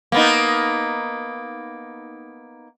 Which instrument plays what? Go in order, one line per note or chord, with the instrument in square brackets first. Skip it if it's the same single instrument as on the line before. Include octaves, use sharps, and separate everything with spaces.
[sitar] A#3 B3 D#4